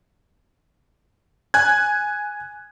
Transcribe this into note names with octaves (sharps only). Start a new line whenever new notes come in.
G#5 F#6 G#6